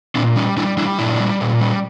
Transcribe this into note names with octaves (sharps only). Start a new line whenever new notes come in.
A#2 C4 D4
G3 C#4 D#4
G3 D4 E4
G3 D4 E4
A#2 D4 E4
G3
A#2
G3